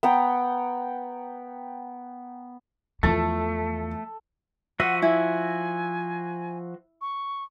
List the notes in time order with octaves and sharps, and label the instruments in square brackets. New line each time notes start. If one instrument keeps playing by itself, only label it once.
[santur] B3 F#5 G5 A#5
[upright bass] E2 E3 [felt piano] F3 A6 [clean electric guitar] A3 [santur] A4
[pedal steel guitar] F3 F#4 E5 [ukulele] F#5 [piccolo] D#7
[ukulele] E4 [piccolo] G#5
[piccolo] C#6